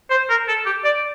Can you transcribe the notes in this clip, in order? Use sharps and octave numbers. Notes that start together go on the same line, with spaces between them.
C5
A#4
A4
G4
D5